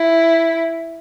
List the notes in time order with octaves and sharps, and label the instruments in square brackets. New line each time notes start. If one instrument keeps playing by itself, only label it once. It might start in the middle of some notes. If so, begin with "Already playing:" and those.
Already playing: [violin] E4